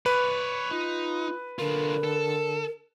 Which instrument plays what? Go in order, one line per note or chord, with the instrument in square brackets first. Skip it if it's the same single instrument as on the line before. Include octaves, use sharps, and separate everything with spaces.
[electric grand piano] B4 [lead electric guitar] C#5 D5
[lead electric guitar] D#4 [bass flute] F4
[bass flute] D3 [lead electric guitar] D4 F4 [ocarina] A#4
[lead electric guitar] A4